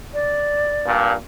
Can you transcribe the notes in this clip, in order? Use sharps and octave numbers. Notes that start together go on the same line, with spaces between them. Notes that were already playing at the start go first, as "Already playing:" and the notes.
D5
G2 A#2